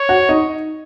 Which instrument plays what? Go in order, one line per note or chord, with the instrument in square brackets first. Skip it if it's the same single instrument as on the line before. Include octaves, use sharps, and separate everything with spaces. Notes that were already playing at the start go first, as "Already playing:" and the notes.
Already playing: [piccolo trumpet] C#5
[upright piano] F#4 F#5
D#4 D#5